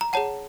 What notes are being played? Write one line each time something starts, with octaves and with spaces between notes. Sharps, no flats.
A#5
G#4 C#5 F#5 A5